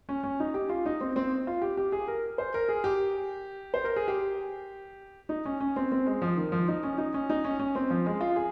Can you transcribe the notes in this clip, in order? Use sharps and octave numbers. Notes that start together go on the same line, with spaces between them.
C#4
C#4
D#4
G4
F4
D#4
C4
C4
F4
G4
G4
G#4
A#4
C5
A#4
G#4
G4
C5
A#4
G#4
G4
D#4
C#4
C#4
C4
C4
G#3
F3
D#3
F3
D#4
C#4
D#4
C#4
D#4
C#4
C#4
C4
F3
G#3
F4
G#4